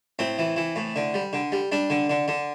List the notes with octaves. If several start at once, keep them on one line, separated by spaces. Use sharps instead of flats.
A2 C4
E3
E3
A2
D3
G3
D3
G3
G3 D4
D3
D3
D3